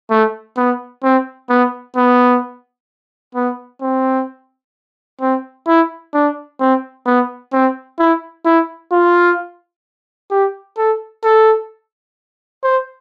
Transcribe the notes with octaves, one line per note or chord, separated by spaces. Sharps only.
A3
B3
C4
B3
B3
B3
C4
C4
E4
D4
C4
B3
C4
E4
E4
F4
G4
A4
A4
C5